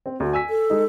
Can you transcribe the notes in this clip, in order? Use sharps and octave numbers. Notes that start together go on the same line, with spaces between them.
C4
D2 F#4
G#5 E6 B6
A4
G#3 D#4